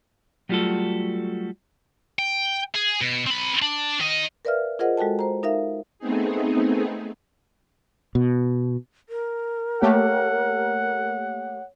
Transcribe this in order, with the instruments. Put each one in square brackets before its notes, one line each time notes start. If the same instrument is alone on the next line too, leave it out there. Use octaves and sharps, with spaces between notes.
[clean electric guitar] F#3 G3 A3 F4 F#4 A4
[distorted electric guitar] G5
G#4
B2
C4 B5
D4
D#3 D#5
[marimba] A#4 B4 D5 E5 F5 F6
F4 G#4 A#4 C5 D#5 F#5
G#3 F#4 A4 G5 A5
C5 A#5
D#4 A#4 E5 F5
[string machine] A3 B3 C4 D#4 G#4
[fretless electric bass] B2
[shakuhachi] A#4
[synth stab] A3 A#3 G4 [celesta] C#5 [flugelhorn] F#5